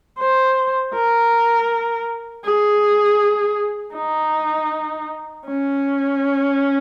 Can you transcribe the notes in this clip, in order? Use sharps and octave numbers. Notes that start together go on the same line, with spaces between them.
C5
A#4
G#4
D#4
C#4